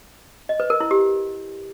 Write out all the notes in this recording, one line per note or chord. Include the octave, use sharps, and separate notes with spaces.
D#5
B4
A#4
E4
G4